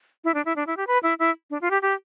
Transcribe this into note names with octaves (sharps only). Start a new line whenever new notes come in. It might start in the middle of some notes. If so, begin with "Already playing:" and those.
E4
D4
E4
D4
E4
G4
B4
E4
E4
D4
F4
G4
G4